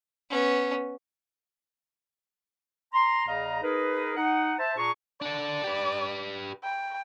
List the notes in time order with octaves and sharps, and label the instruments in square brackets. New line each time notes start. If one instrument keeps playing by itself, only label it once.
[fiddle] B3 C#4
[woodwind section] A#5 C6
E2 C#3 D#5 F5 A#5
D#4 G#4 A#4 B4
D#4 F#5
C5 E5 A5
A#2 D4 G#4 A#5 C#6
[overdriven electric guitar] D4 A4 [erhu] D5
[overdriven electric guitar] G4 B4
[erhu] G5